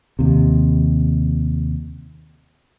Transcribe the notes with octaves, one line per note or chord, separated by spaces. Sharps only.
D#2 C3